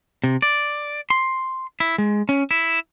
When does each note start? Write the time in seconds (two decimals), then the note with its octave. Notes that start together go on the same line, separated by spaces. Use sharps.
0.24 C3
0.42 D5
1.10 C6
1.80 E4
1.98 G#3
2.29 C#4
2.51 E4